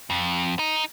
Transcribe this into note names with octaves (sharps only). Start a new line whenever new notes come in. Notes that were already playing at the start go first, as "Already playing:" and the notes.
F2
D#4